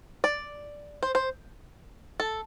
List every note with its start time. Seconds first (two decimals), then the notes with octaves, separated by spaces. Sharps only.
0.24 D5
1.03 C5
1.15 C5
2.20 A4